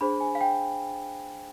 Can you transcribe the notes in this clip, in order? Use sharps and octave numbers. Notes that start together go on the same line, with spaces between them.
D4 G#4 C5 B5
G#5
F5
G5